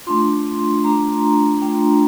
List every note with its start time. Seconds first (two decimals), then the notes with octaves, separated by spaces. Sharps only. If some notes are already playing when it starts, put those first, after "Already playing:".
0.07 A3 D4 F4 C6
0.84 A3 D4 F4 A#5
1.62 A3 D4 F4 G5